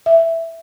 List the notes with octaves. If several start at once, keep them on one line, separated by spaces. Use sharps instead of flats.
E5